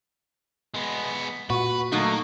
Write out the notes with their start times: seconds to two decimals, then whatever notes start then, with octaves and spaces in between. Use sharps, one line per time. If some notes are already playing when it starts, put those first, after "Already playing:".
0.74 G#3 B3
1.50 A#2 F#4 B4
1.92 F#3 A3 A#3 D#4